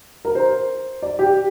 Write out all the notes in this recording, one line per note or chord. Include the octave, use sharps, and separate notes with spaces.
A#4
C5
D5
G4